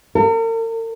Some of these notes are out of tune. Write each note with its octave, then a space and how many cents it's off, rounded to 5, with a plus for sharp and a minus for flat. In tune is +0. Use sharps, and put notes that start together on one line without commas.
A#4 -45